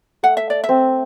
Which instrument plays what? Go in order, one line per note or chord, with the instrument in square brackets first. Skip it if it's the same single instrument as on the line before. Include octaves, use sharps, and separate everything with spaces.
[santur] A3 [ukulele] F#5
[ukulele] E5
D5
E5
[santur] C4